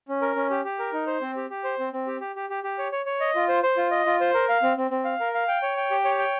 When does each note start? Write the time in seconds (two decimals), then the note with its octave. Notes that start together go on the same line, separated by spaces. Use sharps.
0.08 C#4
0.22 A#4
0.36 C#4
0.50 G4
0.65 G4
0.79 A#4
0.93 D#4
1.07 C5
1.21 C4
1.36 G4
1.50 G4
1.64 C5
1.79 C4
1.93 C4
2.07 G4
2.21 G4
2.36 G4
2.50 G4
2.64 G4
2.78 C#5
2.92 C#5
3.06 C#5
3.20 D#5
3.35 F4
3.49 C5
3.63 C5
3.77 F4
3.91 D#5
4.06 F4
4.21 C5
4.34 A#4
4.49 F5
4.62 C4
4.77 C4
4.91 C4
5.05 F5
5.20 A#4
5.34 F5
5.48 G5
5.63 C#5
5.77 G5
5.91 G4
6.05 C#5
6.19 G5